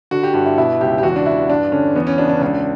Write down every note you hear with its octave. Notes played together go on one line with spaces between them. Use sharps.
D3 F#4
G4
G2 F#4
E4
B2 E4
C#2 G4
G4
E2 F#4
D4
E2 E4
G2 D4
D3 C#4
E2 B3
C#4
C#3 D4
D4
C#2 D4